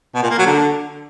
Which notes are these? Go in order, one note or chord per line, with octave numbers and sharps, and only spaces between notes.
B2
A#2
A#3
F#3
D3